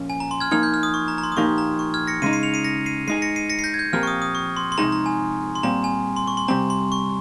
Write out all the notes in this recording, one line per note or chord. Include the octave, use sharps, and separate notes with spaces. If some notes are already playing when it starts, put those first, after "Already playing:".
Already playing: A#2 F3 A#3 C#4
G#5
A#5
C6
F6 G#6
F3 A#3 D#4 F6 G#6
G6
F6
D#6
C#6
A#5
A#5
C6
D#6
A#2 F3 A#3 D#4 G4 C#6
A#5
C#6
F6 G#6
A#6 C#7
C#3 G#3 D#4 C7 D#7
C7 D#7
C#7 F7
C7 D#7
A#6 C#7
C7 D#7
G#3 D#4 G#4 C7 D#7
A#6 C#7
C7 D#7
A#6 C#7
C7
G6 A#6
G#6
G6
A#2 F3 C4 G4 A#4 F6
C#6
D#6
D#6
C#6
C6
C6
C3 F3 G#3 D#4 G#4 A#5
A#5
G#5
C6
A#2 G3 C4 A#5
G#5
C6
C#6
C6
C3 G3 C4 A#5
C6
C#6